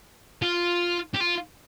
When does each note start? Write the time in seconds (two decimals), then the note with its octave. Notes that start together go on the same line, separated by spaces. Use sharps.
0.42 F4
1.14 G4
1.20 F4